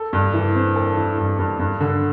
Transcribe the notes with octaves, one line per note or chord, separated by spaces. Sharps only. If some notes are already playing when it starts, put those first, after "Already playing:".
Already playing: A4
G2
E3
C4
A4
E3
G2
G2
G2
D3